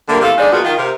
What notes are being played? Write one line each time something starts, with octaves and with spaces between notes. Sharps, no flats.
A#2 D3 G3 A3 A#3 A#4
E2 C3 A3 A4 F5
D#3 G#3 D4 D#4 G#4 D5
A#2 F3 G#3 B3 F4 F#4
D#3 F4
C3 A#4